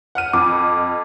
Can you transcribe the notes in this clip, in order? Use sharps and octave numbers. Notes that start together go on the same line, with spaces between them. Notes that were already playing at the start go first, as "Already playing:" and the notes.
F#5 F6 D#7
F2 D6